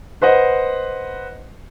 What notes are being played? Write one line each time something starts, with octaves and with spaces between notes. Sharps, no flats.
B4 C5 D#5 F#5